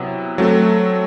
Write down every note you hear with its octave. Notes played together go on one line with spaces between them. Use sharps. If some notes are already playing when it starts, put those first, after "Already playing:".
Already playing: C3 F#3 B3 E4
F#3 A3 C4 F#4 A4